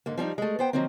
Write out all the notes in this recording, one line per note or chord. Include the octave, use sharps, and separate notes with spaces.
G#2 D3 A#3
F3 G3 C#4 D#4
G#3 A3
B3 C5 G5
D#3 F3 F#3 A#3 C4